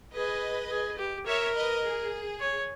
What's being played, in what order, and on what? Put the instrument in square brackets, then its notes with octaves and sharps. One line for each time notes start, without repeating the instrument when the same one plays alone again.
[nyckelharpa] G#4 [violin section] B4 D#5
[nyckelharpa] G#4
G4
[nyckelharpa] A#4 [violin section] C#5 E5
[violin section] B4 D#5
G#4
[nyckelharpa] C#5